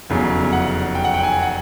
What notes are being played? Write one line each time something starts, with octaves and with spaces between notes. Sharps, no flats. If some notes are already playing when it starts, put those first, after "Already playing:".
F1 E2 C#3 F#3
F#5
G5
F#5
G5
G#5
F#5